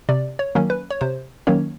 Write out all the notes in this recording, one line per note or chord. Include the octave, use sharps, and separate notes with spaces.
C3 D5
C#5
D#3 F#3 A#3 C#4
B4
C#5
C3 C5
D#3 F#3 A#3 C#4 C#5